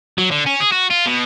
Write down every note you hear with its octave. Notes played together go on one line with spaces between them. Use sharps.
F#3
D3
C#4
G#4
F#4
F4
B2